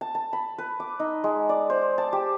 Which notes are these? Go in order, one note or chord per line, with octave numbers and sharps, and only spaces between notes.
A5
A5
B5
B4
D6
D#4
G#3
D5
C5
A5
G4